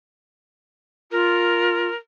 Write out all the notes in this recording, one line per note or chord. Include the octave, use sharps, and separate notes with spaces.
F4 A#4